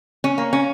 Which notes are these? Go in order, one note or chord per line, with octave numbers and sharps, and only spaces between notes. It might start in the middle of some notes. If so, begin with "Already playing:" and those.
C#4
A#3
C#4